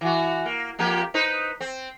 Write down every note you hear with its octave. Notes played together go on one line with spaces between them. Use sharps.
E3 F#4
A#3
F2 A#3 G4
D#4 B4 C5
C4